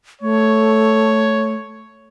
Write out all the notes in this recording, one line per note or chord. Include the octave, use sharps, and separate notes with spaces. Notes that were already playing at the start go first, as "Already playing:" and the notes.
A3 C#5